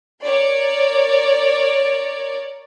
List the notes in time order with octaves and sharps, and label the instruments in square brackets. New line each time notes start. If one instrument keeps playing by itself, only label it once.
[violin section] A#4 C#5 D5